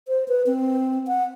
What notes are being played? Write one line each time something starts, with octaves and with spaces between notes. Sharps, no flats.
C5
B4
C4
F#5